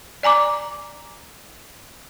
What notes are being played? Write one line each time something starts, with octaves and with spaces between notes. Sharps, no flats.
D5 G#5 A#5 D6